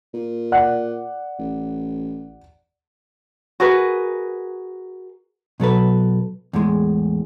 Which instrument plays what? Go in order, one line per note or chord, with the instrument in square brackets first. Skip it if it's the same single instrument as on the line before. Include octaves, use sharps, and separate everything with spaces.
[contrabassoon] A#2
[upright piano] D5 F#5 F#6
[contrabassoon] A1
[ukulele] F#4 G#4 A#4 B4
[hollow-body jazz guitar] B2 F#3 A4 B4
E2 A2 G#3